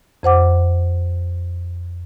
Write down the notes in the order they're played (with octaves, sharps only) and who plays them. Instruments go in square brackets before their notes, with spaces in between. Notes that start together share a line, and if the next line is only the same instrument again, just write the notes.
[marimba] F2 C5 F#5 D6